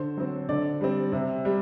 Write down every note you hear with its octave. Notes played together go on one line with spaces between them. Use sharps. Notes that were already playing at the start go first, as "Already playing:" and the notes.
Already playing: D3 C5
F#3 C4
D3 D5
G3 C4
C3
G3